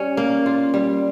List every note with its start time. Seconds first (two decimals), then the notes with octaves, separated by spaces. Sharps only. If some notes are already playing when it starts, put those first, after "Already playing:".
Already playing: G3 C#4
0.17 A#3
0.46 F4
0.74 G3